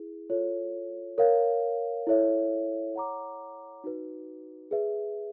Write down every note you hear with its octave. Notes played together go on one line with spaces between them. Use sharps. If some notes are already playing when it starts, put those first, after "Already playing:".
Already playing: E4 G#4
F4 A4 C#5
A#4 C#5 F5
E4 A4 C#5 E5
C#5 F#5 A#5 D6
D#4 F#4 B4
G#4 B4 E5